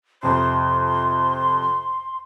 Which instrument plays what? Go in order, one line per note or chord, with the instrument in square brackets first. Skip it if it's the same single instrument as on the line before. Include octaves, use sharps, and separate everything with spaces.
[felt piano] F2 C3 [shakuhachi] C6